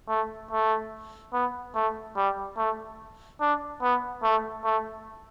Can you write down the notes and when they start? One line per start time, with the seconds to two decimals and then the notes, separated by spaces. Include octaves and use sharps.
0.09 A3
0.51 A3
1.33 B3
1.75 A3
2.17 G3
2.57 A3
3.41 D4
3.82 B3
4.23 A3
4.65 A3